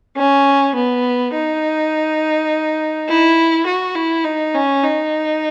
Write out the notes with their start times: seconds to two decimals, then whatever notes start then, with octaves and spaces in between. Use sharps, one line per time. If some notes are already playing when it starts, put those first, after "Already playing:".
0.17 C#4
0.75 B3
1.34 D#4
3.08 E4
3.66 F#4
3.95 E4
4.24 D#4
4.54 C#4
4.83 D#4